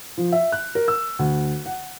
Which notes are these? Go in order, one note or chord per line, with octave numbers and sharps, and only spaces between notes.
F3
E5
F#6
A#4
E6
D2
F#5